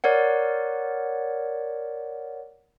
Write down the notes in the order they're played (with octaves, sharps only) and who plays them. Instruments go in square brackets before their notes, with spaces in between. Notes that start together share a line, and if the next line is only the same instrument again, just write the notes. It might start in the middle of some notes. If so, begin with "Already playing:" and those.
[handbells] A#4 C#5 D5 F#5